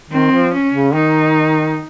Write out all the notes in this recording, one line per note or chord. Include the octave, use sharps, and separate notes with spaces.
D#3 C4
F3
C#4
C#3
D#3 D#4